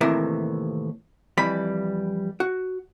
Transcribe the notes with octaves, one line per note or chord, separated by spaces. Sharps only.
D#2 A2 C3 E3 A#4 E5
F2 E3 G3 B5
F#4